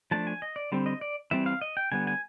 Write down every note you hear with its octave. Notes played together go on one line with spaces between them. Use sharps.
F3 A3 D4 A5
G#5
D#5
D5
D3 G3 C4
D#5
D5
E3 G3 C4 E5
F5
D#5
G5
D3 G3 B3 G#5
G#5